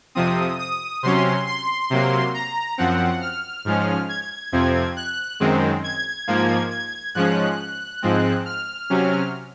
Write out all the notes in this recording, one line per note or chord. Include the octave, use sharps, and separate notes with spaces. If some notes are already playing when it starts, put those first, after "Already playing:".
F2 C3 F3 C4 D#6
D#6
C3 F#3 C#4 C6
C6
C3 F#3 A#3
A#5
F#2 F3 C4 F#5
F6
G#2 F3 G#3 C#4
G#6
F2 C3 F3 C4
F#6
F#2 D#3 G#3 C4
G#6
G#2 F3 A#3
G#6
G#2 F3 G#3 C#4 F#6
G#2 F3 G#3 C4
F6
C3 F#3 C#4